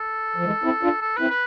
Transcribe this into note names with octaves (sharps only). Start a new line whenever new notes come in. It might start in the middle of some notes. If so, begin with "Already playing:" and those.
Already playing: A4
F3
E3 G#3
C4 E4
D4 F4
A4
C4 E4 B4
B4